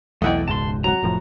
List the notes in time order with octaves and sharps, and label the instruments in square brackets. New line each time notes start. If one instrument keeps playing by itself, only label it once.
[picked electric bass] B1 E2 [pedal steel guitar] A3 E4 D5 [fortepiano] D#5 F#5 G5
[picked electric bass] E1 C#2 G#2 [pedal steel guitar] A5 C6
[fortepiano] F#3 F#4 [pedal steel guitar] A#5
[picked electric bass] F1 A2 F3